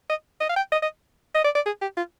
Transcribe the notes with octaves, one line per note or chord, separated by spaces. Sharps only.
D#5
D#5
F5
G5
D#5
D#5
D#5
D5
D5
G#4
G4
F4